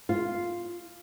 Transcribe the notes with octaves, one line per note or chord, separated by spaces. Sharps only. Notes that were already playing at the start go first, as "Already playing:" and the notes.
F4